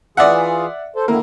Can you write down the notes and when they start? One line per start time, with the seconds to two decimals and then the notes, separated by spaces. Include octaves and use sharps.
0.17 E3 F4 G#4 D5 E5 F#5
0.96 A4 C5
1.08 D3 D#3 A#3 E4